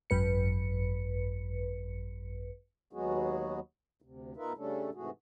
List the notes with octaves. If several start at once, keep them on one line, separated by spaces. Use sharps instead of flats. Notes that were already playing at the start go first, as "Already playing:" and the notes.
G#1 F#2 B4 C#7
D#2 F#3 G#3 B3 F#4 G#4
D2 C3
B2 D#4 F4 A#4 B4 E5
C#3 G3 A3 C#4 D4 A4
G#2 C3 E3 A3 F#4 G#4